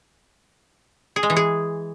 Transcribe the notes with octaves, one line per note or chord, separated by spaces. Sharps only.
G#4
G#3
E3
G#4